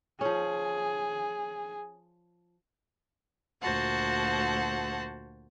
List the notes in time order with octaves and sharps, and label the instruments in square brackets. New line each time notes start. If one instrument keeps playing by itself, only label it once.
[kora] F3 C#4 [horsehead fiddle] G#4
[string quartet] D2 A#2 F#4 C5 F#5 A5